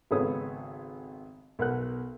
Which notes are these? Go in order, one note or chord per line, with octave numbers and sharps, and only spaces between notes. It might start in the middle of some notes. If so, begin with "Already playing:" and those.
G#1 C#3 B3 A4 C#5 D#6
B1 A#4 F#5 F#6